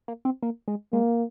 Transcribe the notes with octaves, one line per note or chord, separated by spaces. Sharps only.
A#3
C4
A#3
G#3
G#3 A#3